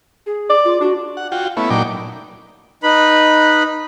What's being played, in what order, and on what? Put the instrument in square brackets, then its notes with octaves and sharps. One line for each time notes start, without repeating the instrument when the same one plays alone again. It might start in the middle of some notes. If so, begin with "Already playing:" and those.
[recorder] G#4
[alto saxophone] D5
[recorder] F4
[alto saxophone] D4 [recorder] F#4
[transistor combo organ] F#5
F4 F#4 G5
A3 B3 C#4 E4
A#2 F#3 D#4 D5 G5 D6
[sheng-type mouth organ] D#4 B4 B5